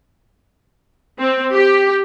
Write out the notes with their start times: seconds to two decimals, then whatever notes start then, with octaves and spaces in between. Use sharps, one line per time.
1.19 C4
1.54 G4